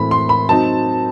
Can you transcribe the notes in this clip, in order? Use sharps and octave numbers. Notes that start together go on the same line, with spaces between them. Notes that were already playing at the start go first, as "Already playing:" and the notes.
Already playing: A2 E3 A3 C4 B5
C6
B5
F#3 C4 D#4 A5